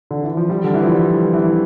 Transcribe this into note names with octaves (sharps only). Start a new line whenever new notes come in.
D3
E3
F3
G3
D3
E3
F3
G3
E3